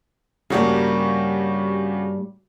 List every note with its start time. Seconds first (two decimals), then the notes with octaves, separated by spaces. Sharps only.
0.50 G2 C#3 G3 A#3 F#4 G4